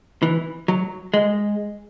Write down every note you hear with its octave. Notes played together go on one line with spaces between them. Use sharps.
E3
F#3
G#3